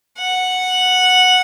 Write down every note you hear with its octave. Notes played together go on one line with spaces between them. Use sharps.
F#5